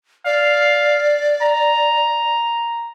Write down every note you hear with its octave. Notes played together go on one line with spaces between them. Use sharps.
D5 F5
A#5